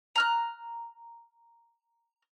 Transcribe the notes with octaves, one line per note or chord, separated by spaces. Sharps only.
A#5 F6 F#6